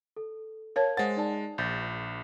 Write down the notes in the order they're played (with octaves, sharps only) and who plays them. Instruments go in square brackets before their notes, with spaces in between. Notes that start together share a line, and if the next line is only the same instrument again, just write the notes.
[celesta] A4
[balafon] A#4 C#5 A5 [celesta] F5 G#6
[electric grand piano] G#3 A6 [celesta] C5 [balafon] F#5
[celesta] D#4 D5 A5
[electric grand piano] A#1 [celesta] G6 A6 A#6